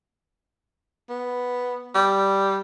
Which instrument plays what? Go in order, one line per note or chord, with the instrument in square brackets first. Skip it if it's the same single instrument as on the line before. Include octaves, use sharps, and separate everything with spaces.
[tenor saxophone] B3
G3